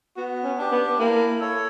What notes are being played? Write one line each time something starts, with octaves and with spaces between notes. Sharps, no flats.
B3 F#4
C#4
D4 G4
B3
A#3 E4
A4 C#5